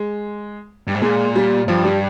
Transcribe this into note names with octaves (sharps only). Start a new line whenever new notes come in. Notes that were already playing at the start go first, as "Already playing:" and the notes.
Already playing: G#3
G2
G#2
A#2 G#3
G3
G2 F3
G3